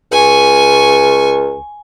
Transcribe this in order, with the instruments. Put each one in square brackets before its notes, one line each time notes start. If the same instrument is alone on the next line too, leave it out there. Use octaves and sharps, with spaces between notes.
[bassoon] C#2 [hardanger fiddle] G#5 C#6